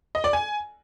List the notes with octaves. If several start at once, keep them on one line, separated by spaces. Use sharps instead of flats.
D#5
D5
G#5